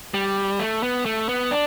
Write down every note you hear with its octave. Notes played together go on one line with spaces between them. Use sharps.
G3
A3
B3
A3
B3
D4